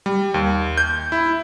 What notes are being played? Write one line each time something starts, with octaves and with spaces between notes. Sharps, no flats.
G3
D#2
G6
E4